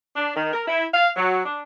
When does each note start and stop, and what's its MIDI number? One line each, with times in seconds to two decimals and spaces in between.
0.15 0.33 62
0.36 0.50 51
0.53 0.63 70
0.67 0.85 64
0.94 1.10 77
1.17 1.41 54
1.45 1.62 62